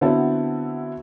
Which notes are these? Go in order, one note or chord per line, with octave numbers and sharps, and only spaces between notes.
D3 B3 C4 E4 F#4 A5